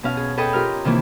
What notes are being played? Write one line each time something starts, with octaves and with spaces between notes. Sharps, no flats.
B2 C#4 F5
G#4
G#4 A4 B4 D#5 G5 D#6
F4 G4 A#4 F6
C3 D#3 E3 A#3